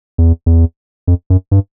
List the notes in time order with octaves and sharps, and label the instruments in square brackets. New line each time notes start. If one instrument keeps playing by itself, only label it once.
[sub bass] E2
E2
F2
F#2
G2